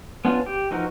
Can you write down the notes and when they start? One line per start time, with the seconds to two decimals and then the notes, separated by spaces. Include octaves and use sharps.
0.25 B3 C#4 D4 F4
0.46 G4
0.71 E3 F3 D#4 F#4 A#4